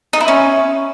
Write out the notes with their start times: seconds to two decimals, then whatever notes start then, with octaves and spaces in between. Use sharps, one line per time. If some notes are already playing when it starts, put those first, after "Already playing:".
0.13 D#4
0.21 E4
0.28 C#4